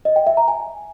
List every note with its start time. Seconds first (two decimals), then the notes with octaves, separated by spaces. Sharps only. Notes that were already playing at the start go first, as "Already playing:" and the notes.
0.05 D#5
0.16 G5
0.27 E5
0.37 A#5
0.48 G#5